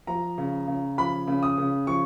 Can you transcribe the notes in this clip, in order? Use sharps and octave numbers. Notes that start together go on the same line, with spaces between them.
F3 A#5
C#3
C#3
F3 B5
C#3
D#6
C#3
F3 C#6